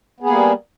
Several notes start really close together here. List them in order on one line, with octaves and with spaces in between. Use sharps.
B3 G#4 A#3 G3